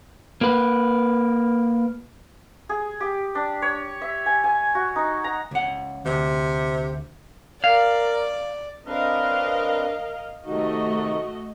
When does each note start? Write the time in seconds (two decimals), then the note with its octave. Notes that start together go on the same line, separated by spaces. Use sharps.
0.41 A#3 B4
2.69 G#4
3.00 G4
3.35 D4
3.62 C#5
4.01 E5
4.26 G#5
4.44 G#5
4.75 F#4
4.96 D#4
5.24 A#5
5.51 C#2 F#5
6.06 D2 C3
7.64 A#4 D5 F5
8.86 C4 D4 A#4 B4 D#5 F5
10.46 C3 D#3 A3 D#4 F#4 D#5